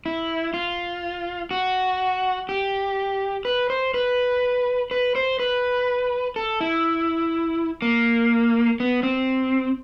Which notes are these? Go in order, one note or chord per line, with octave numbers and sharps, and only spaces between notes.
E4
F4
F#4
G4
B4
C5
B4
B4
C5
B4
A4
E4
A#3
B3
C4